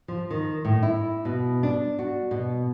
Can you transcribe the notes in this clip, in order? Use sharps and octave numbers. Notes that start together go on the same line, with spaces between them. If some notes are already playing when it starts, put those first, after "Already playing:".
F3
D#3
A2
E4
B2
D4
F#4
B2